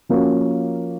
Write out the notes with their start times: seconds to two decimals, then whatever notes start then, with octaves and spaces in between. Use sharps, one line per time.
0.09 F3 A#3 C#4 F#4